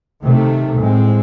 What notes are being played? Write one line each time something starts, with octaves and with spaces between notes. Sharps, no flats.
C3 D#3 A3
A2 G#3 C4